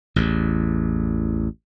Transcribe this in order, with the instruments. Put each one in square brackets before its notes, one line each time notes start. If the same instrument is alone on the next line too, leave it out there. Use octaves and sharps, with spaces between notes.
[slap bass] A1 E2